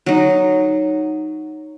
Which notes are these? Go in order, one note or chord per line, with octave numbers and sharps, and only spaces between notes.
F#3 D#4